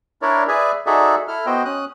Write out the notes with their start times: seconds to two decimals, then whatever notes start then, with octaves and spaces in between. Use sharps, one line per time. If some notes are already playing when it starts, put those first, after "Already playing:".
0.22 D4 E4 A#4 C#5 D5
0.48 G#4 B4 D5 E5 G#5
0.86 D#4 F#4 G#4 A4 D5 E5
1.28 E4 A4 F6
1.46 B3 F#4 C5 D#5 G5
1.65 C#4 D#6 F#6